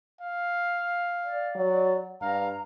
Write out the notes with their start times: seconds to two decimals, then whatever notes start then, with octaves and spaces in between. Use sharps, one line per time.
0.21 F5
1.25 D5
1.55 F#3
2.21 G2 F5 A#5